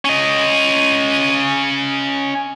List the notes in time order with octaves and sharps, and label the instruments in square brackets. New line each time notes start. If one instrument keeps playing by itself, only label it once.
[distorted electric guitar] C#4 D#5